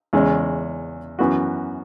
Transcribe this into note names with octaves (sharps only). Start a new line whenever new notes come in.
E2 C#3 G#3 C#4
F#2 E3 B3 F#4